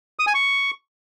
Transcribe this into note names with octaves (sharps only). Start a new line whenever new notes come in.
D#6
G#5
C#6